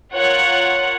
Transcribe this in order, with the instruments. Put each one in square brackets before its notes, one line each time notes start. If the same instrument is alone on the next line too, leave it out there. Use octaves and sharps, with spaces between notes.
[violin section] F4 A#4 C#5 F#5